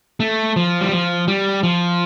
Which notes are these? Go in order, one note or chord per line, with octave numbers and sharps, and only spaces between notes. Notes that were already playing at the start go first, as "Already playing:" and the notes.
A3
F3
G3
F3
G3
F3